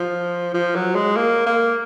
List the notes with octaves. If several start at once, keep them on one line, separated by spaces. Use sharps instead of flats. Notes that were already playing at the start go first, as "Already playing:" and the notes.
Already playing: F3
F3
F#3
G#3
A#3
A#3